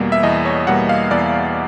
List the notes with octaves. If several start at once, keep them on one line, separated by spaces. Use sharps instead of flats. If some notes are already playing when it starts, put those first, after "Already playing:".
Already playing: E2 B2 G3 A#3
E5
E2 D#5
C#5
B2 G3 A#3 F#5
F5
E2 D5